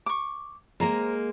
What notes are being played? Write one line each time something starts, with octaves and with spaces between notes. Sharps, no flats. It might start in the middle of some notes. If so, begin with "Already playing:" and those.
C#6 D6
G#3 A#3 C5 A#5